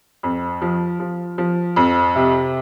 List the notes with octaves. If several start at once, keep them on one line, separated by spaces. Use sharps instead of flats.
F2
F3
F3
F3
F2
C3